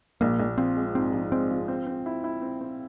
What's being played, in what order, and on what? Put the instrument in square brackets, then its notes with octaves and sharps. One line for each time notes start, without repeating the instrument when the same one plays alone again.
[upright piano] A#1 [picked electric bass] A#3
[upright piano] A#1
[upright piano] F3 [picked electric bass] C4
[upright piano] G#3
[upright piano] G#2 [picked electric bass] C4
[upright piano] F3
[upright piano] G#3 [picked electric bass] C4
[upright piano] F3
C4
C4
E4
E4
C4
C4